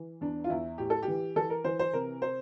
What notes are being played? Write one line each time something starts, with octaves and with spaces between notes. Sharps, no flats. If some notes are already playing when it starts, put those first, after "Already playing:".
Already playing: E3
E2 D4
F4
E2 E4
A2 G4
A4
G4
E3
E3 A4
A#4
E3 C5
C5
C3 A#4
C5